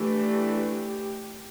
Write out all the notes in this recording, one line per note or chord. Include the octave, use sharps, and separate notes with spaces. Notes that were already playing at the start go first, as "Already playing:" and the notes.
Already playing: E3 A3 D4 G4
G4